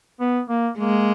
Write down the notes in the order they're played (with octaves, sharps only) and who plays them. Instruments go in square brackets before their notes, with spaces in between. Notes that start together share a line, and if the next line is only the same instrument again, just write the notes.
[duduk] B3
A#3
[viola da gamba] G#3 [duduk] A#3